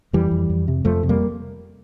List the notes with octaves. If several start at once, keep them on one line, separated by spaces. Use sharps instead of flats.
F2 E3 G3
F2
F2
C3
F2 F3 A3
C3
G3 A#3